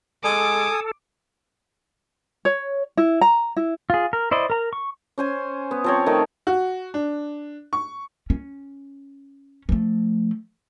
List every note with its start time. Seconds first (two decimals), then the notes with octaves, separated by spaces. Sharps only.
0.24 G#3 A4 G#5 D6 D#6
2.45 C#5
2.97 E4
3.21 A#5
3.56 E4
3.90 F4 G#4
4.13 A#4
4.31 E4 C5 D5 D#5
4.50 A#4 A#5
4.73 C#6
5.18 C#4 C5 G#5
5.71 B3
5.84 F3 C4 C#5
6.06 D#3 A3 D#4 A#4
6.47 F#4
6.94 D4
7.73 C#6
8.30 C#4
9.69 F3 A3